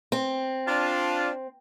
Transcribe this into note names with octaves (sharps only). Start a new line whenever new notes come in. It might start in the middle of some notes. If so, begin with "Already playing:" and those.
C4
D4 F4